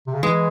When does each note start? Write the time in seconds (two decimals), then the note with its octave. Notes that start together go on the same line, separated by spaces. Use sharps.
0.07 C3
0.14 C#3
0.23 E3 G#3